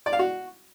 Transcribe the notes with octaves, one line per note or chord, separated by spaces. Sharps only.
D5
F5
F#4